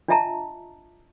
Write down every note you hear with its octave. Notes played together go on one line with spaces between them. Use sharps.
D4 F4 D#5 E5 A5 A#5